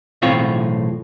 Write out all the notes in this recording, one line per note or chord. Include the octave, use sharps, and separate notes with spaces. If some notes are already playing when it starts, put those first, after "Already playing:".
B1 E2 A2 C4 F4 C#5